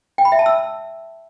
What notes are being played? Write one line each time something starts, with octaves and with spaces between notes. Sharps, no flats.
G5
B5
E5
A5
E6